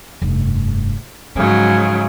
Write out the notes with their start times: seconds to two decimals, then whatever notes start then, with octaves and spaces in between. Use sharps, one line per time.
0.22 F1 G2
1.35 G#2 C#3 F3 F#3